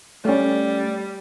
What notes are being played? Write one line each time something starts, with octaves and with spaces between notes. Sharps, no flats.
G3 A3 C#4